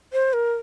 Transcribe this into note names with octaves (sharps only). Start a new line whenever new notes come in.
C5
A#4